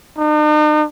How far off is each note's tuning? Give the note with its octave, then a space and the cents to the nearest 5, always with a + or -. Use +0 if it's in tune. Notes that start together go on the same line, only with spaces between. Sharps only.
D#4 -45